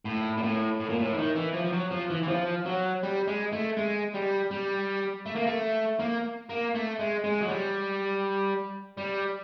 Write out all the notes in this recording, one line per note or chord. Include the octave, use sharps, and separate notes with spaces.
A2
A#2
A2
A2
A#2
A2
E3
D#3
E3
F3
F3
F#3
F3
E3
E3
F3
F#3
G3
G#3
A3
G#3
G3
G3
A3
A#3
A3
A#3
A#3
A3
G#3
G#3
F#3
G3
G3